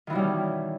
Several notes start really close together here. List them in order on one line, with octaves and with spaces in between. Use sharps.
D#3 E3 B2 G3 C#4